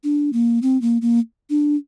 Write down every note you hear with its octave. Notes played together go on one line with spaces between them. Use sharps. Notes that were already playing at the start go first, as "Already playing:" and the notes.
D4
A#3
C4
A#3
A#3
D4